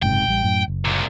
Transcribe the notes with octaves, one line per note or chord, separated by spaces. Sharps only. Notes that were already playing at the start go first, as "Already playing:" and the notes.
F#1 G#2 C3 G5
A1 G3
F#2 A2
F#1
C2 A#2